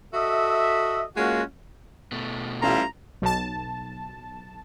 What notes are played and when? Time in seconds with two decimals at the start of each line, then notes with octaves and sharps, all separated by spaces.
0.14 F#4 A4 D#5 E5
1.16 G#3 A#3 C#4 F4 F#4
2.12 B2 A3
2.62 A1 G3 E4 F4 A#5
3.22 B1 A5